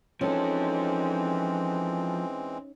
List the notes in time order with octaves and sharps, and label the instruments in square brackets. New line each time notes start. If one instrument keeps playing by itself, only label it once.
[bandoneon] E3 G#3 C4 [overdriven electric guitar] F3 A4 [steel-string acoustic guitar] C#4 D#4